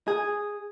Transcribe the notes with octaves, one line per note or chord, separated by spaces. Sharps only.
G#4